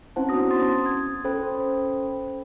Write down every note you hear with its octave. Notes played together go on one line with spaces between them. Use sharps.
C4 C#4 E4 C5 F#5 A5
B3 C#4 D4 F#4 D#6 A#6
C6 D#6 A6
D#6 G#6
C#4 A4 C5 G5 B5 D#6